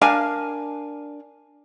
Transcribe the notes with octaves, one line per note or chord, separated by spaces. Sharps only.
D4 A#4 F5 G#5